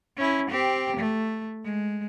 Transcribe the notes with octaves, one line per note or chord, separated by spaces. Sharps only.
C#4 E4
C4 G4
A3
G#3